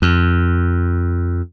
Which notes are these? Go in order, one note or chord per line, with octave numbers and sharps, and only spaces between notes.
F2